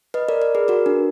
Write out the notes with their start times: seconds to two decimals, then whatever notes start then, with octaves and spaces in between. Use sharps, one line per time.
0.14 B4 D#5
0.29 A#4 D5
0.42 A#4 D5
0.55 G#4 B4
0.68 F#4 A#4
0.86 D4